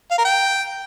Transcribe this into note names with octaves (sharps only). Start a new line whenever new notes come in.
F5
A#4
G5